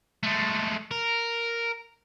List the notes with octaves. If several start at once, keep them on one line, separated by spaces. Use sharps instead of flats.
G#3 A3
A#4